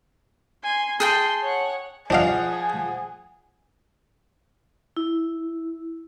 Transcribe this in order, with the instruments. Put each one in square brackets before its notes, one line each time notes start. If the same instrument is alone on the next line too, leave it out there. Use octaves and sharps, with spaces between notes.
[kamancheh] G#5 C6
[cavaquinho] G#4 G5 A5 [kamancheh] C6
[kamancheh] C#5 F#5
[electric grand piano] F3 F#5 [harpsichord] D4 D#5 F5 [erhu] G#4
[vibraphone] E4